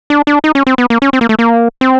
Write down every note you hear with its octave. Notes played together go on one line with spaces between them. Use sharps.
D4
D4
D#4
C#4
C4
B3
A#3
C#4
C4
A#3
A3
A#3
C4